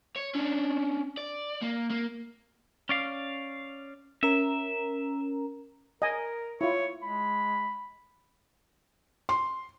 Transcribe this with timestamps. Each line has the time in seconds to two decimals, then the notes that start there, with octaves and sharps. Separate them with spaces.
0.16 C#5
0.35 C#4 D4
1.17 D5
1.62 A#3
1.90 A#3
2.89 C#4 D5 F5
4.23 C#4 A#4 E5 A#5
6.02 A#4 D#5 G#5
6.61 E4 F4 C#5
7.02 G#3 B5
9.29 C6